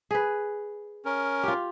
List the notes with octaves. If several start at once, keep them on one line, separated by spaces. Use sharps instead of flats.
G#4 B4
C#4 A#4
F4 G4